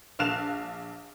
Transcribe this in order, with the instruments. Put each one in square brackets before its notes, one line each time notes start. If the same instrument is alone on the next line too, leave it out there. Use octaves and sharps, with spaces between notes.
[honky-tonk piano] A#1 F5 A5 F#6 E7 F7